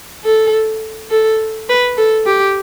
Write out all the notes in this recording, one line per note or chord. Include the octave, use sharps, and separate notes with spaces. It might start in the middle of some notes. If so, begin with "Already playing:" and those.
A4
A4
B4
A4
G4